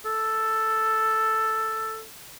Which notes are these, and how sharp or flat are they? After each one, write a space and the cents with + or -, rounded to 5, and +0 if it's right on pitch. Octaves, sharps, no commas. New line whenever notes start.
A4 +0